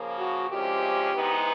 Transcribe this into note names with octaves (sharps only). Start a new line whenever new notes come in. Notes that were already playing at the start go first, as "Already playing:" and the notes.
Already playing: C#3 F3 A#3
F#4
D2 C3 F3 G#3 C#4 G4
C3 E3 G#3 B3 D#4